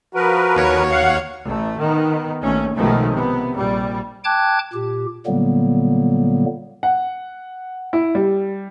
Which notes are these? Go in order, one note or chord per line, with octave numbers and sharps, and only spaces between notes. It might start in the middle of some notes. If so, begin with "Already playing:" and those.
F3 F#4 A#4 B4
D#2 C#5
F5 F#5
A1 A3
D#3 B3
A#1 D#3 A3 C#4
B1 B2 D#3 F3 G#3 A3
C3 B3
A#1 G3
G5 A5 D6 F#6 G#6
A#2 G4
A#2 D3 F#3 G3 A#3 B3
F#5
E4
G3